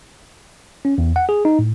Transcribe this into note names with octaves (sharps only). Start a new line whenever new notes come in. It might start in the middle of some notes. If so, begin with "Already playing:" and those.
C#4
E2
F#5
G#4
D#4
A2